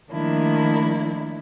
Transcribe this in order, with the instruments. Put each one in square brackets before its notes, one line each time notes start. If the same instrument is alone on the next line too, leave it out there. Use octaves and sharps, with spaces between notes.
[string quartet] D#3 F3 A3 A#3 D4 E4